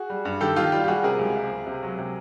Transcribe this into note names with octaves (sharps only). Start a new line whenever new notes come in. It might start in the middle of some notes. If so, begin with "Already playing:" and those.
Already playing: F#4 G#4
G3
G2
D#3 G4 A4
D#3 F4 G4
G3 F4 G4
G4
G3 F#4 G#4
C3 G#4 A#4
C#2
C3
C#2
C3
F#3
C3